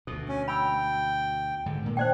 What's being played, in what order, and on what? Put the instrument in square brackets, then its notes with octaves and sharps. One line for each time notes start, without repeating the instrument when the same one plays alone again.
[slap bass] D2 B2 [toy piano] A4
[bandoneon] C#4
[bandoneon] G5 [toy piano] B5 E6
[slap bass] G#2 D3
A#2 D#3 A3
[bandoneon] D4 [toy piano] C5 D5 G5